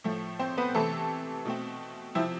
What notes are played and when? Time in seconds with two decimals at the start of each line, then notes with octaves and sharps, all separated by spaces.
0.04 A2 F3 A3
0.39 C4 C5
0.58 B3 B4
0.75 C3 E3 A3 C4 A4
1.45 B2 A3 C4
2.15 C3 F3 C4 E4